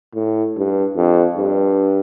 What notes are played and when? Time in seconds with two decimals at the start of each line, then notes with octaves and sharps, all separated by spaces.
0.15 A2
0.56 G2
0.96 F2
1.37 G2